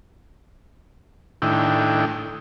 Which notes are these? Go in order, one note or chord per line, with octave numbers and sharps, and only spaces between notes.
A2 D#3 D4 E4 G5